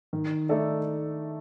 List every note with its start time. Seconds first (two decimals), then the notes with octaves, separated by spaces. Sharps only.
0.13 D#3
0.49 A3 D#4 A4 D5